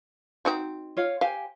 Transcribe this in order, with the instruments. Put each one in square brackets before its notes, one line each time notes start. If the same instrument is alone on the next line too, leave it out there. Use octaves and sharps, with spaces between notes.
[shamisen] C4 D#4 F#4
[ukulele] F4 C#5 F5
[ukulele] G4 C5 G#5 [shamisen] F5